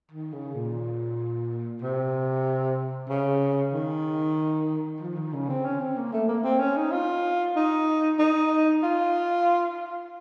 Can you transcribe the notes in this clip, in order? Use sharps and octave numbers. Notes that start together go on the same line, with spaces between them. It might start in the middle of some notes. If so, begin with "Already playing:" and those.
D#3
C#3
A#2
C3
C#3
D#3
F3
D#3
C#3
C4
C#4
C4
A#3
A3
A#3
C4
C#4
D#4
F4
D#4
D#4
F4